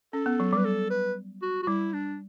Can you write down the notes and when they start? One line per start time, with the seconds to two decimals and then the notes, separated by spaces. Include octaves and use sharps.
0.13 C#4 A4
0.26 B3
0.40 F#3
0.53 G3
0.58 B4
0.65 A4
0.90 B4
1.42 F#4
1.63 F#4
1.67 G3 E4
1.94 D4